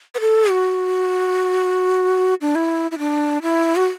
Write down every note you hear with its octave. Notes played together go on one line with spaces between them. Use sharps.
B4
A4
F#4
D4
E4
E4
D4
E4
F#4